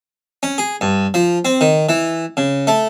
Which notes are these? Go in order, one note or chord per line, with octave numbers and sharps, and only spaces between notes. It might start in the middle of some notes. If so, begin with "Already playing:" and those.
C#4
G#4
G2
F3
C4
D#3
E3
C#3
A3